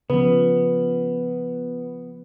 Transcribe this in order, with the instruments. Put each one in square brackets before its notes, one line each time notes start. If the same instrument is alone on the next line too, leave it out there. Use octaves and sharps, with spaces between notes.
[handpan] C#3 F3 [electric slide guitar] B3 [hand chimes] B4